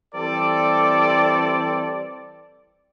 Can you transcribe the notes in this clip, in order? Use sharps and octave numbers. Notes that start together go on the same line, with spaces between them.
E3 G3 C4 A4 D5